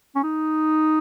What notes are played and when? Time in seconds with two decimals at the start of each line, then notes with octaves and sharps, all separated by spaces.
0.16 C#4
0.23 D#4